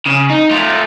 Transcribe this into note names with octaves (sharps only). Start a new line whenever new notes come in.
C#3
D#4
A3 F4